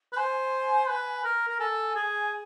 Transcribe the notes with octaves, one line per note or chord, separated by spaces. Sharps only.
B4
C5 G#5
B4
A#4
A#4
A4 G#5
G#4